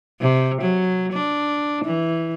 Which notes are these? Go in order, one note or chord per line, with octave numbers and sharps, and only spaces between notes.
C3
F#3
D4
E3